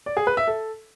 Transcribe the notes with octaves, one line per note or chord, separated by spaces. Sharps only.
D5
G#4
B4
E5
A4